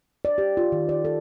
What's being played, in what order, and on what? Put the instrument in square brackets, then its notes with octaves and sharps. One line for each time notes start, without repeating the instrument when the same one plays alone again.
[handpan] D5
G4
F4
D#3
D5
A4